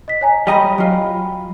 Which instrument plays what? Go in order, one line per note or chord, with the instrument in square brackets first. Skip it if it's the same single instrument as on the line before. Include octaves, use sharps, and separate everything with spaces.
[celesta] D#5 B6
C#5 G#5 A#5
[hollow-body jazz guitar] G3 D#5 A#5 [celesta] G5 B5
[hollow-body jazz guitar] F#3 F4